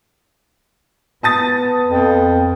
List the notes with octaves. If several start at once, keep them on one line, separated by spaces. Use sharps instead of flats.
B3 A5 D#6 A6
F2